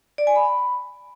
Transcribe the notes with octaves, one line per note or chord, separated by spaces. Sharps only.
D5
G#5
B5